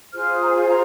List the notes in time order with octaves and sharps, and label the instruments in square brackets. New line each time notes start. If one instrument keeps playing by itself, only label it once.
[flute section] F4 G#4 C5 F6
D#6
A#5
G#5
A#5